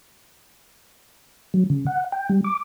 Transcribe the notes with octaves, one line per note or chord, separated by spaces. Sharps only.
F#3
C#3
F#5
G5
G3
D6